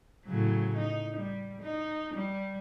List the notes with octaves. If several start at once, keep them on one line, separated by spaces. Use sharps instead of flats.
A2 C#3 F#3
D#4
G3
D#4
G3